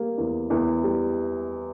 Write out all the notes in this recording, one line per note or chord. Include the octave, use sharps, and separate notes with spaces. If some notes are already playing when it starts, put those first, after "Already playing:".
Already playing: G3 A#3
E2
E2
G3